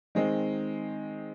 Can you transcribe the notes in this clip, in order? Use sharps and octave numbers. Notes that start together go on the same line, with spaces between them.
D#3 G#3 C4